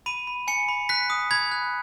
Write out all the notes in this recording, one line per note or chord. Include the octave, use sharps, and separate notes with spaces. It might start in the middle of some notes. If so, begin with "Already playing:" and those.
B5 D#7
B5
G#5 C#7
B5
F#6 B6
D#6
B5 G#6
F#6